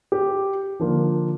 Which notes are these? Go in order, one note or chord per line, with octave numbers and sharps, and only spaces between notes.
G4
D3 F3 A#3 D4 F4